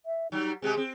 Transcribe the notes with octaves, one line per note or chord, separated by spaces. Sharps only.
E5
F#3 G3 D#4
C3 G#3 G4 G#4
C4